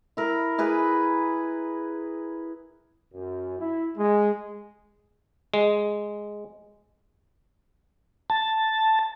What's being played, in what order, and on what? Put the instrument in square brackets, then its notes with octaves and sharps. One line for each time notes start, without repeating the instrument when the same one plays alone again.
[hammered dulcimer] E4 A#4
E4 G#4 B4
[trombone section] F#2
E4
G#3
[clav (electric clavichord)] G#3
[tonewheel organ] A5